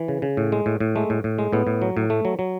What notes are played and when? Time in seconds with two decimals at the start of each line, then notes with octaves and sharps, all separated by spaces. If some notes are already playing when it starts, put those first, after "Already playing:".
Already playing: E3
0.08 C#3
0.22 C#3
0.37 A2
0.52 G#3
0.66 A2
0.80 A2
0.96 G#3 A3
1.10 A2
1.24 A2
1.38 G#3
1.53 A2 B3
1.67 A2
1.82 F#3
1.97 A2
2.10 A3
2.25 F#3
2.39 F#3